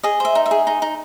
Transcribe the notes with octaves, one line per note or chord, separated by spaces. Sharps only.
G#4 D#5
C5 E5
D#4
E5
G#4
D#4
D#4